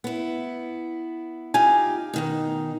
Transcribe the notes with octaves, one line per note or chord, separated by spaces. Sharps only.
B3 E4
D#4 F4 G4 G#5
B2 D#3 D#4